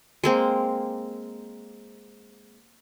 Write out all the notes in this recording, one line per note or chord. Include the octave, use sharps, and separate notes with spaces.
G#3 A#3 C4